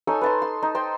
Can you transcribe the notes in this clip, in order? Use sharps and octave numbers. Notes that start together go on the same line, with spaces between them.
D#4 A4 C#5 G#5
B4 A5 C6
C6
D#4
C5 G5 A5 C6